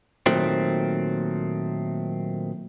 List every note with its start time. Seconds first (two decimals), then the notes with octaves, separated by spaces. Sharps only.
0.26 A#2 D#3 F#3 A3 C4